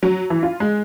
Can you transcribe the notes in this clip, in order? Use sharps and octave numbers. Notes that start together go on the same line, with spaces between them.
F#3
E3
F4
G#3